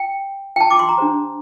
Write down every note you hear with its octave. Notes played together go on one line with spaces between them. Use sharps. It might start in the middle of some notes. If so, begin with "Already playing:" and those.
Already playing: G5
G5
A5
D6
C6
A#5
D4 G4 C5